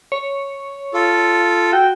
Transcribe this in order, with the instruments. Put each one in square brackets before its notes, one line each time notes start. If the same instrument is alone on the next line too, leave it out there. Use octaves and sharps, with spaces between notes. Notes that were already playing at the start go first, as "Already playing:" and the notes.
[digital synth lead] C#5
[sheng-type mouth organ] F4 A4
[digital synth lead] F#4 [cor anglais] G5